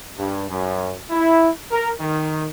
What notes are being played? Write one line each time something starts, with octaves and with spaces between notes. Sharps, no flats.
G2
F#2
E4
A#4
D#3